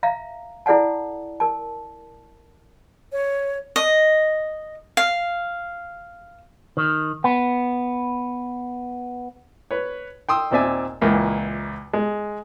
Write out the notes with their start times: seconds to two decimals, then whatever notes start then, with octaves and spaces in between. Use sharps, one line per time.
0.03 E5 F5 A#5
0.66 E4 A4 D5 F#5 A5
1.40 A#4 A5
3.12 C#5
3.76 D#5
4.97 F5
6.77 D#3
7.24 B3
9.71 B4 C#5
10.29 G5 C6 D#6 E6
10.51 D#2 A#2 C4 D5 E5 G#5
11.01 C#2 A#2 E3 A#3
11.93 G#3